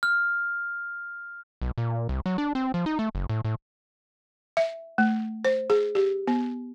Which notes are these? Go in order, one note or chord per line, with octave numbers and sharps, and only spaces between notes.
F6
B1
A#2
C2
F#3
D4
C4
F3
D#4
A3
F#1
A2
A2
E5
A3
C5
G#4
G4
B3